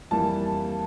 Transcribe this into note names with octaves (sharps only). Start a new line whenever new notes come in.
F2 E3 G3 A#3 A5